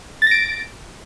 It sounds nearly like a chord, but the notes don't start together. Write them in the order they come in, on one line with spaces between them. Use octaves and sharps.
A6 A#6 D7